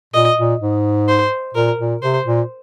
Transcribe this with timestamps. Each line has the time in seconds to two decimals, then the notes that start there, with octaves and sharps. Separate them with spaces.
0.14 A#2 D#5
0.38 A#2
0.61 G#2
1.08 C5
1.55 A#2 A#4
1.79 A#2
2.02 C3 C5
2.25 A#2